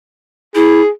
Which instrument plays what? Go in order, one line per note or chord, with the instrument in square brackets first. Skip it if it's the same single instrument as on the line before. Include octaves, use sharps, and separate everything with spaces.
[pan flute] E4 [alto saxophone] G#4